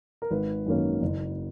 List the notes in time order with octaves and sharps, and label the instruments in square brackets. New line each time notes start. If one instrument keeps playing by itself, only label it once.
[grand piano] A#4
G#1 B4
F#2 D#3 A#3 C#4
F#1